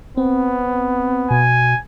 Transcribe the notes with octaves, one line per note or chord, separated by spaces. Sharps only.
B3 C4
B2 G#5